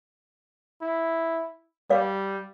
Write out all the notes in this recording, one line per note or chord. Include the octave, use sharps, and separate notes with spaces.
E4
G3 D5 F5